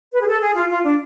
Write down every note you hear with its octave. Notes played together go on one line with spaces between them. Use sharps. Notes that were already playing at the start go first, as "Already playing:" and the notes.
B4
G#4
A4
G#4
F4
F4
D4